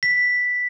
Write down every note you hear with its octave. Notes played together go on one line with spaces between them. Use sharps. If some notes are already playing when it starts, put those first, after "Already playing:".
B6